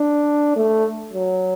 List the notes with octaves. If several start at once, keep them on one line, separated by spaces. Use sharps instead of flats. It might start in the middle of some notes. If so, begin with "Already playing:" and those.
Already playing: D4
A3
F#3